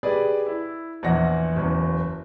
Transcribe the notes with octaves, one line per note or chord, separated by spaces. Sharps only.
G4 G#4 B4 D5
E4
A#1 E2 F#5 A#6
F#1 E2